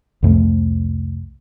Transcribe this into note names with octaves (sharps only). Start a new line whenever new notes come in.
C2 F2 A3